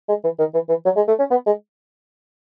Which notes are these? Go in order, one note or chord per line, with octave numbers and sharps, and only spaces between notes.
G#3
E3
D#3
E3
E3
F#3
G#3
A3
C#4
B3
G#3